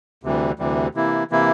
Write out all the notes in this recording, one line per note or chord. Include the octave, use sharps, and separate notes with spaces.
D2 C3 E3 G3
D2 C3 E3 G3
C3 E3 A#3 E4
C3 E3 A#3 E4